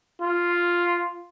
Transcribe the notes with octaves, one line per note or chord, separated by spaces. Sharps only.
F4